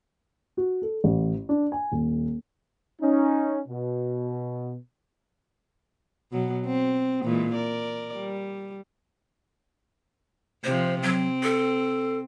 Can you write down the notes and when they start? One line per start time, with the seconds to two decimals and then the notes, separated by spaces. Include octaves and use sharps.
0.57 F#4
0.82 A4
1.04 A1
1.49 D4
1.72 G#5
1.92 D#1
3.01 C#4 D#4
3.68 B2
6.32 B2 F#3
6.66 C4
7.24 A#2 E3 G#3
7.54 A#4 D5
8.15 G3
10.64 C3 F3 C5
11.03 F#3 C4
11.43 A4